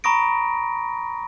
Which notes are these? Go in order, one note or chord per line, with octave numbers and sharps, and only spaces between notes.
A#5 B5 C#6 D#6 A#6 D7